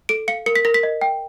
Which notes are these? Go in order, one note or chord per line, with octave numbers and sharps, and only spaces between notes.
A4 D7
F5 C#7
A#4 C#7
B6
A#4 A#6
B6
D#5
G5